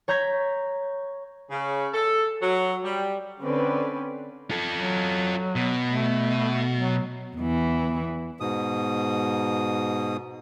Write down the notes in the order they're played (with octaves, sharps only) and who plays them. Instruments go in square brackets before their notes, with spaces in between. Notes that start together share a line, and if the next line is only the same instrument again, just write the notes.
[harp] C#5 A#5 G6 G#6 B6
[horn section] C#3
A4
F#3
G3
[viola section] D3 C4 C#4 B4 D5
[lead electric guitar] F4 A4
[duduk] F#3
[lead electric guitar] B2
[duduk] A3
F#3
[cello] E2 E3
[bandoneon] G#2 B2 D#6